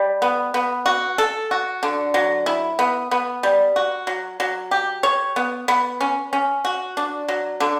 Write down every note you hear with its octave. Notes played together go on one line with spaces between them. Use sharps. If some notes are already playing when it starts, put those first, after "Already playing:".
Already playing: G3
B3
B3
F#4
A4
F#4
D3
F#3
E4
B3
B3
G3
F#4
F#3
F#3
G4
C#5
B3
B3
C#4
C#4
F#4
D4
F#3
D3